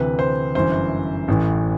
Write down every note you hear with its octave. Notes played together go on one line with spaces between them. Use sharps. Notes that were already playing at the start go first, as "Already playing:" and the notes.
Already playing: D2 C3 E3 B4
C5
G1 F#2 E3 C5
A1 A2 E3